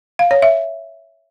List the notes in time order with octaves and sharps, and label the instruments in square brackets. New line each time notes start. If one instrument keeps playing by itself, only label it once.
[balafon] F5
C#5
E5